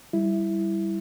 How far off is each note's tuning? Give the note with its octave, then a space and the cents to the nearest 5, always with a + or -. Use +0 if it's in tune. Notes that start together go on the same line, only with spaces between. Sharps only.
G3 +0 E4 +0